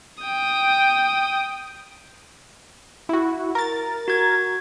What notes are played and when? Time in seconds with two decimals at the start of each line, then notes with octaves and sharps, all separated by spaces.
0.24 G5 D#6
3.09 E4 F#4
3.55 A#4 A6
4.08 F#4 G#6